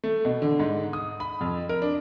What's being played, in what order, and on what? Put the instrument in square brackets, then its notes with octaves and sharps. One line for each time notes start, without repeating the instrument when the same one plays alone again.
[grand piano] A3
B2
D3
G#2
D#6
B5
F2
A#4
D4